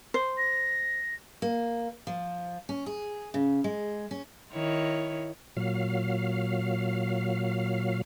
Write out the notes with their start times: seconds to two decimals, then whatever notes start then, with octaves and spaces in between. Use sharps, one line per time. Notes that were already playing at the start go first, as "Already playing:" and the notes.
0.14 C5
0.38 A#6
1.42 A#3
2.07 F3
2.69 C#4
2.86 G#4
3.34 C#3
3.64 G#3
4.11 C#4
4.53 D#3 E4 C#5
5.57 A#2 F#3 F5